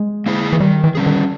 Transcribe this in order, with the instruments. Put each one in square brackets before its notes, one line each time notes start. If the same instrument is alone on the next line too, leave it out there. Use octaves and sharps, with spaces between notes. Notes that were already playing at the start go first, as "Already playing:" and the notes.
Already playing: [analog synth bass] G#3
[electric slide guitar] A#3 E4 G#4
[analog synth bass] E3
[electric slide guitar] D#3 [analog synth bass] G3
[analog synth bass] E3
[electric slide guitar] G3 A#3 C#4 G#4
[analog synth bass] D#3